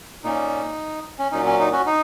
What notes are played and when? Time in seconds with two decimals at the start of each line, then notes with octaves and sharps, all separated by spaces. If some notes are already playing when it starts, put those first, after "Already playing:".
0.24 A#2 A#3 C#4 D#4
1.19 C#4
1.32 A#2 F#3 C#4 D#4
1.46 C#4
1.59 D#4
1.72 C#4 F#4
1.86 D#4